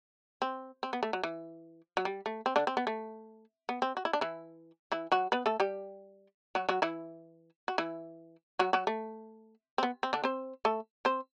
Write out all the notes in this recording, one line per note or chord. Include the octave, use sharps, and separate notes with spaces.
C4
C4
B3
A3
F#3
E3
F#3
G3
A3
C4
D3 D4
C4
B3
A3
B3
C4
F#4
E4
D4
E3 E4
E3 E4
F#3 F#4
B3 B4
A3 A4
G3 G4
F#3 F#4
F#3 F#4
E3 E4
F#4
E3 E4
F#3 F#4
F#3 F#4
A3
C4
B3
C4
D3 D4
C4 C5
A3 A4
C4 C5